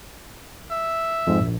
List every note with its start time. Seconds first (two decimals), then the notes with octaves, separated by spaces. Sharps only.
0.71 E5
1.27 F2 G#2
1.41 A#1